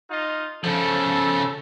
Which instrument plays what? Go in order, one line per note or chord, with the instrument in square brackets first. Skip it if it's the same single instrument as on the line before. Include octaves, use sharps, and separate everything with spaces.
[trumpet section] D#4 F4 D#5
[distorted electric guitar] C#3 F3 [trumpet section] A4